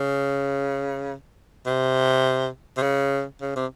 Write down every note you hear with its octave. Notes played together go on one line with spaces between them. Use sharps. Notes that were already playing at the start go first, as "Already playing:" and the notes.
Already playing: C#3
C3
C3
C#3
C#3
C3